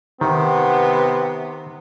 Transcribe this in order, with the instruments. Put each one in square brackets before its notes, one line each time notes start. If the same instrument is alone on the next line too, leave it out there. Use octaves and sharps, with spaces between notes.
[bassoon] C3 [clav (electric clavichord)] D#3 [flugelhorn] B3